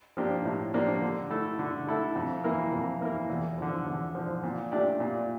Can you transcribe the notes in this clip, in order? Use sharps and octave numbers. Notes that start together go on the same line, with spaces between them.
F3 A#3 D4 G4
A2
F3 A#3 D4 G4
D3
A3 E4 A4
D3
A3 E4 A4
F2
E3 A#3 E4 A#4
F2
E3 A#3 E4 A#4
E2
D3 F3
E2
D3 F3
A#2
A3 D4 G4 D5
A#2